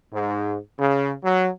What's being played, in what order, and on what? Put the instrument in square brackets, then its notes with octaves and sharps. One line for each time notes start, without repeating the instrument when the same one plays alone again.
[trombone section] G#2
C#3
F#3